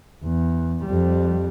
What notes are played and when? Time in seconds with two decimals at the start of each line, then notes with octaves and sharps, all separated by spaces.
0.25 E2
0.85 F2 G3